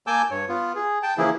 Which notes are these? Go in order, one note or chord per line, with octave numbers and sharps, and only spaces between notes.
A#3 G#5 A5 D6 E6 G6
G2 C#5
B3 F4
G#4
G5 A5
C#3 E3 F3 A#3 E4 G#4